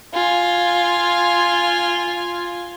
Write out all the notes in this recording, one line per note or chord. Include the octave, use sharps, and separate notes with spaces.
F4 G#5